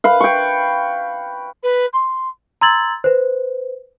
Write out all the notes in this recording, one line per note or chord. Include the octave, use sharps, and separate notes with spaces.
B4 F5
G5 C#6
B4
C6
A#5 C6 E6 G#6 A6 F#7
B4 C5